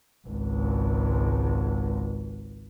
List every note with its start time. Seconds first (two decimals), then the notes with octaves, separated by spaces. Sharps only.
0.28 G#1 C#2